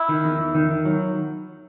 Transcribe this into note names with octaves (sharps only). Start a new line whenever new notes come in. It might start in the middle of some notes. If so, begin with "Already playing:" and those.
Already playing: E4
D#3
E2
E2
D#3
D#3
F#3